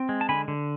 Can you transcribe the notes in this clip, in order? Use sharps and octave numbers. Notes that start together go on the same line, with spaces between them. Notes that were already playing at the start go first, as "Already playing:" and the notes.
Already playing: C4
G#3
A5
D3 G#5 B5
D3